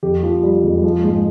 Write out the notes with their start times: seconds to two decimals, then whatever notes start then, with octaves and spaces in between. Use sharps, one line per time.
0.03 F2 G4
0.23 F3 F4
0.43 F3 G3
0.64 F2 G#3
0.84 F3 G#3
1.04 G#2 G#3